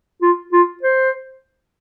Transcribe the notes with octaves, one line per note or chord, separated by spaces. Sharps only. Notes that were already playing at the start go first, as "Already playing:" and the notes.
F4
F4
C5